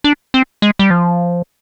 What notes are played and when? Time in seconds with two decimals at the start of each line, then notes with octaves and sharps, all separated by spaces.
0.04 D4
0.34 C4
0.62 G#3
0.79 G3
0.90 F3